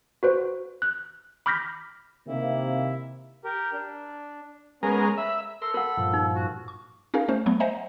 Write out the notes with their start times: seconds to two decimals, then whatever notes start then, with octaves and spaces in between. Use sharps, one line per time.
0.23 F#4 B4 C5
0.82 F#6
1.46 B5 D6 F6 G6 A#6 B6
2.28 C3 D#3 A#3 E4
3.44 G4 A#4
3.73 D4
4.83 G#3 B3 C#4 A#4
5.18 E5 B5
5.62 A4 A#4 C6
5.74 A#4 F#5 B5
5.97 G2 A#2 F3
6.14 D#4
6.35 F#4
6.68 C#6
7.14 C#4 D#4 G#4 A#4 F5
7.28 A3 C#4 C5
7.46 F#3 A3 B3
7.60 C5 D#5 E5 F#5 G#5 A#5